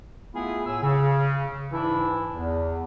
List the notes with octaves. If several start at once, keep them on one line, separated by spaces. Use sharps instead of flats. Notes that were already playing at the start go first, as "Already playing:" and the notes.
A3 B3 E4 F4 G#4
A2 G#5 E6
C#3
G#2 E3 D4 E4
E2